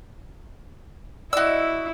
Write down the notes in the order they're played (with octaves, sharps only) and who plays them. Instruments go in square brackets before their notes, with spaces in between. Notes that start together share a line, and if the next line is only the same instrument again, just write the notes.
[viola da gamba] E4 [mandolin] F#4 E6 [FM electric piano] D5 D#5